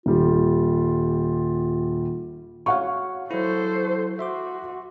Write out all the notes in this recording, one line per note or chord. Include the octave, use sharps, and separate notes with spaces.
D#1 G3 F4
F#4 C#5 F5 F#5 C#6
F#3 E4 A4 C5
F#4 E5 C6 D6